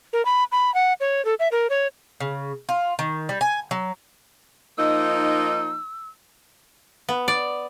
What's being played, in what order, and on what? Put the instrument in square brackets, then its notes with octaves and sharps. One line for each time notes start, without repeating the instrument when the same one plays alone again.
[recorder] A#4
B5
B5
F#5
C#5
A4
E5
A#4
C#5
[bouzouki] C#3
F4
D#3
G3
G#5
F#3
[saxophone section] F3 A#3 D#4 [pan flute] E6
[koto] B3
D5